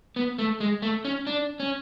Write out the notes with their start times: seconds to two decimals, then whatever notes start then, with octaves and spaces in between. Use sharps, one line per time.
0.16 B3
0.38 A3
0.60 G#3
0.82 A3
1.05 C#4
1.27 D4
1.60 C#4